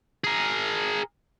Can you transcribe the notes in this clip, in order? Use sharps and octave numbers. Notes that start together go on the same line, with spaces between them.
G#4 A#4